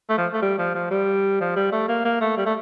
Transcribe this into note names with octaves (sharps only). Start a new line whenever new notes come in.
A3
F3
A3
G3
F3
F3
G3
F3
G3
A3
A#3
A#3
A3
G3
A3